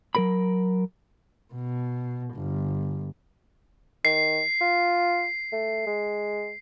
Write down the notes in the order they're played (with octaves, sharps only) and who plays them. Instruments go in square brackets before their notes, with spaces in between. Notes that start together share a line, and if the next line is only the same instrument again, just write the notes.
[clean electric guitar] F#3 A#4 B5
[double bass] B2
G1
[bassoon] D#3 [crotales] C7
[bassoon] F4
A3
G#3